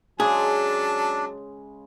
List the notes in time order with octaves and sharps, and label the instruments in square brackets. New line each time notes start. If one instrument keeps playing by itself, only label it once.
[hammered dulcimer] C#3 G#3 [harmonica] F#3 A5 [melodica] D4 [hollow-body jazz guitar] G#4